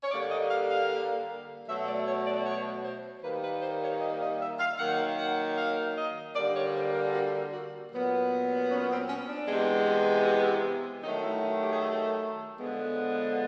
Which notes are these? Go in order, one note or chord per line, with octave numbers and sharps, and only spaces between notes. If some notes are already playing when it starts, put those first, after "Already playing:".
C#5
D3 G3 A#3 D5
D#5
F5
F5
B2 F#3 A3 E5
D5
C#5
D5
C#5
C5
D#3 G3 A#3 B4
B4
C5
C#5
D#5
D#5
E5
F5
D#3 F#3 A#3 F#5
F#5
F5
D#5
D3 G3 A#3 D5
C#5
C5
A#4
F#4
F#4
A#2 F#3 B3
C#4
C4
C#4
D4
C3 E3 G#3 B3
D#3 F#3 A3 D#4
E4
F#4
G4
G#4
A4
D3 F3 G#3 B3